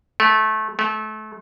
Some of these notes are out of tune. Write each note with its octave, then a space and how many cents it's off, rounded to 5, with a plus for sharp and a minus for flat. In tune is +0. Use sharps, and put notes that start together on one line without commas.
A3 -20
A3 -30